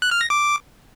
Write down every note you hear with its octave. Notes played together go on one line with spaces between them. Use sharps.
F#6
F6
A#6
D6